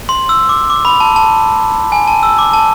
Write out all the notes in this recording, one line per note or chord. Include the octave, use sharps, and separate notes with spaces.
C6
E6
D6
D6
B5
A5
A5
G#5
A5
E6
D6
A5